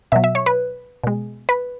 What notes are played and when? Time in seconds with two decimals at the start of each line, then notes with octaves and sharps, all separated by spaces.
0.12 B2 F#3 E5
0.24 E5
0.35 C#5
0.46 B4
1.04 B2 G#3
1.49 B4